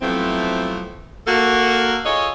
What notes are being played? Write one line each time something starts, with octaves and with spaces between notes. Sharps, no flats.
F3 F#3 A3 B3 C4 E4
A#3 F#4 A4
F4 G#4 A4 C#5 D#5